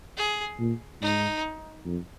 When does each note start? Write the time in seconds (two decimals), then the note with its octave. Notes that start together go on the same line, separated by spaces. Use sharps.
0.17 G#4
0.59 A#2
1.01 G#2 D#4
1.85 F2